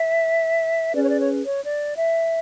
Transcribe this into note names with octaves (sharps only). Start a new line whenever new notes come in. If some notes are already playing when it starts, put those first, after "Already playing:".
Already playing: E5
C#4 G#4 B4 D5
C#5
D5
C#5
C#5
D5
E5